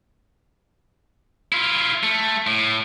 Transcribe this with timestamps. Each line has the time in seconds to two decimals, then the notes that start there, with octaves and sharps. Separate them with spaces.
1.52 E4 F4
2.03 A3
2.47 A2